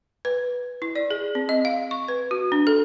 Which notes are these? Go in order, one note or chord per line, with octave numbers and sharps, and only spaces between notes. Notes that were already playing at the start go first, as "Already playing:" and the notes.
B4
E4
D5
G#4
C4
D#5
F5
C#6
B4
F#4
D4
A4